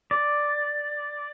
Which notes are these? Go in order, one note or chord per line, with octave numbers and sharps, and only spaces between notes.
D5